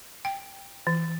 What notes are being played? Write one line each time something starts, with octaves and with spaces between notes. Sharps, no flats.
G5
E3